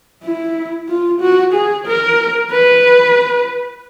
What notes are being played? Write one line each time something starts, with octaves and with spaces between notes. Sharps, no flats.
E4
F4
F#4
G#4
A#4
B4